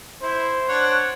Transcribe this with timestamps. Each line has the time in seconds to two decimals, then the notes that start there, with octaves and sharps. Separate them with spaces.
0.23 E4 C5
0.69 D4 C#5 F#5